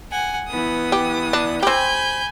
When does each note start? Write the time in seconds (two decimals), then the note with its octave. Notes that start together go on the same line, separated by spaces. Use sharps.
0.12 F#5 G#5
0.49 E3 B3 D#6
0.92 G4
1.33 D4
1.63 C4 G4 G#5 B5 G6